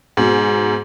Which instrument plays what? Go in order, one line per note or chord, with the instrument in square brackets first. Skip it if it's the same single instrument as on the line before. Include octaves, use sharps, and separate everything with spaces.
[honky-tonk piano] G#2 B2